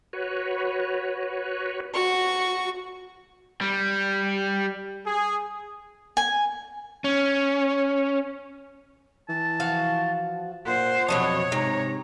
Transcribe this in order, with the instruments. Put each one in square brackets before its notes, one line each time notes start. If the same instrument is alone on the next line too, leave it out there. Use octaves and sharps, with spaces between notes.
[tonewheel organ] F#4 B4 C#5
[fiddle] F#4 C#6
[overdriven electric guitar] G3
[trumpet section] G#4
[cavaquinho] G#5
[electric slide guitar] C#4
[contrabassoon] E3 [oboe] A5
[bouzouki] F3 F#4 F5
[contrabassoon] A#2 [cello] C5 [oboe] F#5
[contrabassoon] F2 [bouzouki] B2 F#3 D4 [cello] C#5 [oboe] D#5
[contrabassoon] G#2 [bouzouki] C3 [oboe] A#5